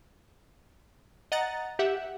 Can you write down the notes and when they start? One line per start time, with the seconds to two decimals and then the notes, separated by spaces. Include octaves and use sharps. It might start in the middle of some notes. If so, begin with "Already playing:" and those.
1.32 D#5 F#5 A#5 A6
1.79 G4 E5 F#5